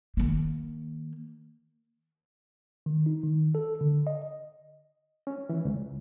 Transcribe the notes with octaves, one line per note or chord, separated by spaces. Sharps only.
D#3 A#3
D#3
D#4
D#3
A4
D3
D#5
C#4
E3
C#2